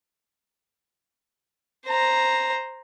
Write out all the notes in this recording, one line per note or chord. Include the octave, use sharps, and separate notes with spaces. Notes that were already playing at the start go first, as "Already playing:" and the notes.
C5 A#5